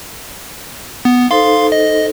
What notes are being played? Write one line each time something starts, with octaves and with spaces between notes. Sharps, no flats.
B3
D#4 A4 C5 F5 C6
D#5